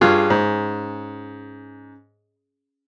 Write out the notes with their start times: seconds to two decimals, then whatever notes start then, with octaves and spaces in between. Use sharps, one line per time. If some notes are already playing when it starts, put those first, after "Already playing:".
0.01 G2 C#4 F4 G#4 F#6
0.30 G#2